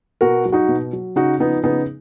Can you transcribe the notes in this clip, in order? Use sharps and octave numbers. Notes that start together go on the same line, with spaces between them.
B2 F#4 A#4
F#3
D#4 F#4
B2
F#3
C#3 D#4 F#4
F3 B3 D#4
C#3 B3 D#4